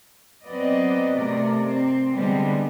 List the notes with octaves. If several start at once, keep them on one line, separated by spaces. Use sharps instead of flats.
F#3 B3 C4 B4 D5 D#5
C3 A3 A#4 D5
C4
D3 G3 G#3 B3 C4